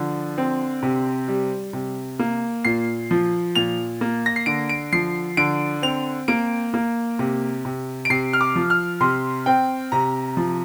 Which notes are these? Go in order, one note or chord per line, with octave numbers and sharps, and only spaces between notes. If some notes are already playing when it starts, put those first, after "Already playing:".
Already playing: D3 F3
C4
C3
G3
C3
A#3
A#2 C7
F3
A#2 F7
A#3
A#6
C7
D3 D7
D7
F3 C7
D3 D7
C4 F7
A#3 D7
A#3
C3
C3
D7
C3 C7
F6
D6
F3
F6
C3 C6
C4 G5
C3 A#5
F3